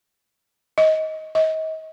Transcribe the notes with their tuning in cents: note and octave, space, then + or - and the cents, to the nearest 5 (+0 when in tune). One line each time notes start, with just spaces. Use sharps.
D#5 +20
D#5 +35